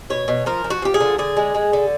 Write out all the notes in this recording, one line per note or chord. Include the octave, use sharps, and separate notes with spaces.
B2 C#5
B2
F3 A#4
F3
F#4
F3 G4
G#4
D3
D3 G#4
G#3
G#3
D3